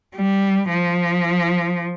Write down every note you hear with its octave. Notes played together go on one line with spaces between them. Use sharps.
G3
F3